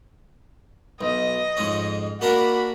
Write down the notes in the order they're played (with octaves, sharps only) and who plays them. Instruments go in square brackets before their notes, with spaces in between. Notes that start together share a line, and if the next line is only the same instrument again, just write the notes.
[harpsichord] B1 [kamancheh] D#5
[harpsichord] F2 G#2 C#4
[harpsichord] A#3 D4 A#4 [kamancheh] F#4 B5